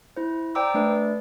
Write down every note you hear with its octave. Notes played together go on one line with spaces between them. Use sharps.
E4 C5
C5 D5 G5 A#5 D6 E6
A3 D4 B4 D5